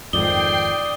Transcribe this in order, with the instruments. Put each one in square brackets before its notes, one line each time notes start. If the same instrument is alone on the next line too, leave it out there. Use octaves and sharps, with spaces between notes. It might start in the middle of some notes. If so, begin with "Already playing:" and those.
[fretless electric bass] F2 G#2 D#3 [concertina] D5 D#6 [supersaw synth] G5 C7 [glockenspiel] G7